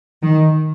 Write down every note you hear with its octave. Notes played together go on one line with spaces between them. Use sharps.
D#3